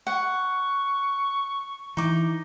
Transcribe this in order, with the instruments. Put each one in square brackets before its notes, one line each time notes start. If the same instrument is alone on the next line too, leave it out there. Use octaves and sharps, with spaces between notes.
[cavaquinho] F#5 [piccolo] C#6
[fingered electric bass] E3 [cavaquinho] D#4 D6